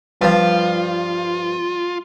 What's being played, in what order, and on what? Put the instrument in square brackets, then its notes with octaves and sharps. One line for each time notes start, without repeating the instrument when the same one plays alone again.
[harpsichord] G2 F3 [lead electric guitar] F4